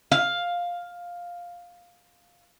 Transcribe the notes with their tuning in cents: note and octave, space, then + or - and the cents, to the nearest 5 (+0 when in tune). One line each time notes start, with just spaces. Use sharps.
F5 +10